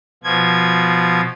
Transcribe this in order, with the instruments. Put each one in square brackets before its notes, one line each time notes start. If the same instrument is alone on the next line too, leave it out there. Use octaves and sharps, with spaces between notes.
[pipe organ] B2 F3 G#6